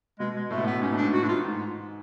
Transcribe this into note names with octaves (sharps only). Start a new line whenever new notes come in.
B2 G#3
G#3
A2 A3
B2
A2 B3
G#2 C#4
A2 D4
G#2
F#4
A2 D4 F4
G#2